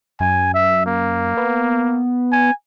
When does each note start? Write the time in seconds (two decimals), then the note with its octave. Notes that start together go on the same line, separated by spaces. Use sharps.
0.20 F#2 G#5
0.54 E5
0.86 A#3
1.37 B3
2.32 G#5